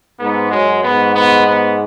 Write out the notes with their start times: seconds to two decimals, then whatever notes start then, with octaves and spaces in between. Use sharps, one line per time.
0.19 G#2 B3
0.51 F#2 G#3
0.83 G#2 B3
1.15 B3
1.47 B3